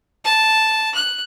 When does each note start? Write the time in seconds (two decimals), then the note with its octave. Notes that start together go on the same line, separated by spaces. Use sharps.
0.25 A5
0.94 F#6